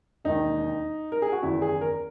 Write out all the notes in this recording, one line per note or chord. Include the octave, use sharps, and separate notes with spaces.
E1 D#2 D#3 D#4
A#4
G#4
F#4
F#1 E2 D#3 E4
G#4
A#4